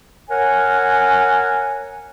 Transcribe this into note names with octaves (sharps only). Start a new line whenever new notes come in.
A#4 C#5 F#5 G#5